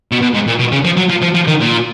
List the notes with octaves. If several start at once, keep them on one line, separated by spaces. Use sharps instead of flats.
B2
B2
G#2
A#2
B2
C#3
F3
F#3
F3
F3
F3
D#3
A#2